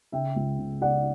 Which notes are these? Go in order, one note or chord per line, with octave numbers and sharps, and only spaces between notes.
C#3 E5 G5
C#2
C#3
C#3 D5 F#5